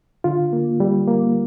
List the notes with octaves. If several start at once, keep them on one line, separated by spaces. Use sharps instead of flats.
D3 F4
A#3
G3
A#3